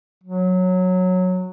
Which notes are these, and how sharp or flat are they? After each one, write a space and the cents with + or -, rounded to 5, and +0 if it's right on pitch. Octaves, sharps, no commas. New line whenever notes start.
F#3 -10